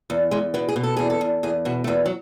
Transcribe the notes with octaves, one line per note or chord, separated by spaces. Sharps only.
E2
E2 G#3
B2 B3
G#4
B2
A4
E2 G#4
A4
E2
E2 G#4
B2 F#4
A3
E2 B3
F#3